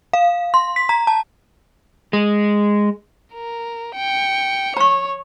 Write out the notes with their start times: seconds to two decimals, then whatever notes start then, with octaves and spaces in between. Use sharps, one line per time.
0.13 F5
0.54 C6
0.76 B6
0.89 A#5
1.07 A5
2.13 G#3
3.34 A#4
3.95 G5 C#7
4.77 C#5 A#5 C#6